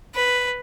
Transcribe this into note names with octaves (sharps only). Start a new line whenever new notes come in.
B4